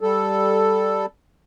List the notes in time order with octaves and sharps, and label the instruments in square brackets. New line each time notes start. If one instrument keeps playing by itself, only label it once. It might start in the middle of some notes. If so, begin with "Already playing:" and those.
[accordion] G3 A4